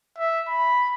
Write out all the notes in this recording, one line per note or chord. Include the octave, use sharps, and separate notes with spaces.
E5
B5